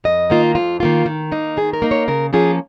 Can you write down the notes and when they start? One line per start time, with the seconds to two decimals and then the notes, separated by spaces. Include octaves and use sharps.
0.04 F2 D#5
0.30 D#3 A#3 F4
0.55 F2 F4
0.80 D#3 A#3 F4
1.06 D#3
1.31 A#3 D#4
1.57 D#3 G#4
1.73 A#4
1.82 A#3 D#4
1.91 C#5
2.08 C#3 A#4
2.33 F3 A#3 C#4 F4 G#4